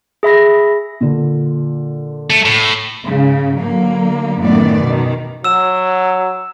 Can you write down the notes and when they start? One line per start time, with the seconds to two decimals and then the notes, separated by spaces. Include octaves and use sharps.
0.23 G#4 E5 B5 A#6
1.01 A#2 D3
2.30 A3
2.46 A2
3.03 G#2 C#3
3.58 D3 F#3 A#3
4.40 F#2 A2 D#3 E3 B3 D5
4.82 B2 D#3
5.44 F#3 E6 E7